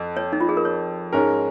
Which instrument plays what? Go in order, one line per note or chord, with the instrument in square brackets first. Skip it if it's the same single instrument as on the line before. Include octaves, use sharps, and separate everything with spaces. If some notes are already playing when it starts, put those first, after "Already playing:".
Already playing: [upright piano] F2
[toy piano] C#5
D#4
F4
G#4
A#4
C#5
[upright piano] G#2 G#3 C#4 A#4